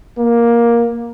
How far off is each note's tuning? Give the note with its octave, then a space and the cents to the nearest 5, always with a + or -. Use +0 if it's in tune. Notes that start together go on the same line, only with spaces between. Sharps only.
A#3 +10